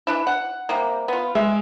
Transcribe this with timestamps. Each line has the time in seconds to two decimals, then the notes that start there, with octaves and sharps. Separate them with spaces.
0.07 E3 D4 E4
0.27 F#5
0.69 C3 G3 A#3
1.08 B3 F4
1.35 G#3 E5